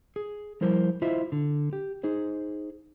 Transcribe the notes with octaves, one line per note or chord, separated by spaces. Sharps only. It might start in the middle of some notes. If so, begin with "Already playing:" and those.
G#4
F3 G3 E4 A#4 C5
E4 F4 C5 D#5 E5
D3
G4
D#4 G#4 C5